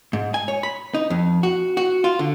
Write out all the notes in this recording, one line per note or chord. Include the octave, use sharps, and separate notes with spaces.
G#2
G#5
C#5
B5
D#4
F2
F#4
F#4
F4
D3